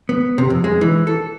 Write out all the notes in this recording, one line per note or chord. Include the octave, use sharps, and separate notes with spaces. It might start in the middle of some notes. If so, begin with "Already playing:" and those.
B3
C3
F2
G#3
E3
A4